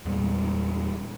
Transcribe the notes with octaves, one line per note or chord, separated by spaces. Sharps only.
E2 A#2 G3 G#3